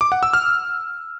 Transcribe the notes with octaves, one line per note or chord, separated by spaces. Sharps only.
D6
F#5
E6
F6